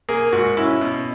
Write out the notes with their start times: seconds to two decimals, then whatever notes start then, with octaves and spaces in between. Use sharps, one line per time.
0.09 A#3 G#4
0.32 G#2 F#4
0.57 C#4 E4
0.81 B2